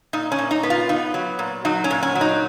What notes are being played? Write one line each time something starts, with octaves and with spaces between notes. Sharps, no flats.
A#2 D#4
C#4
A#2
D#4
B3
F4
B3 D#4
F#3
A#2
F#3 D#4
C#4
A#2
C#4
F#3
D#4